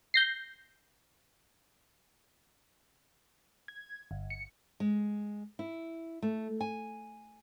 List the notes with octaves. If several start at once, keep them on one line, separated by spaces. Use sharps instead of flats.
G6 A#6 C7
G#6
G1
C#7
G#3
E4
A3
G#5